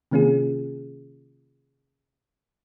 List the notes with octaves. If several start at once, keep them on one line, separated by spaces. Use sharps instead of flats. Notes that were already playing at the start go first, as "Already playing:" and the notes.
C3 D#3 A#3 C#4 F4 G#4